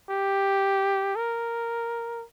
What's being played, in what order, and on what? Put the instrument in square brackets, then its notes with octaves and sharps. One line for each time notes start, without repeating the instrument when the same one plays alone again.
[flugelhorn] G4
A#4